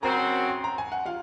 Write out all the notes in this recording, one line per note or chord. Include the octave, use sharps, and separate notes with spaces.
C#3 F#3 C4 F#4 A#4 A#5
C6
A#5
G#5
F#5
F4 F5